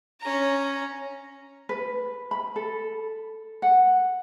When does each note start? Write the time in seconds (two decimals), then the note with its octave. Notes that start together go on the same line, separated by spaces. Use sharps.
0.20 C#4 A#5
1.69 B4
2.31 B5
2.56 A4
3.62 F#5